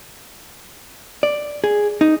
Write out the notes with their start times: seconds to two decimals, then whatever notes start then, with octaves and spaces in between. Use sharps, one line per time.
1.23 D5
1.64 G#4
2.01 D#4